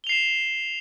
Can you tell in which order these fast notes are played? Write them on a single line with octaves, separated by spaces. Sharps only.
G7 F7 C7 E7